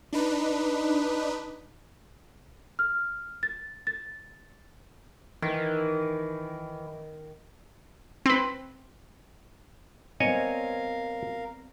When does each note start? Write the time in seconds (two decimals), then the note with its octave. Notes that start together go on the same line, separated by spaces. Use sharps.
0.13 D4 D#4 B4
2.79 F6
3.43 A6
3.87 A6
5.42 D#3 E3
8.26 C4 B4
10.20 G3 B3 C4 A#4 C#5 D#5 F5 G#5